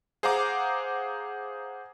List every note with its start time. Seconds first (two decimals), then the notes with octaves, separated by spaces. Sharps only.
0.23 G#4 C5 F5 F#5 A#5 D6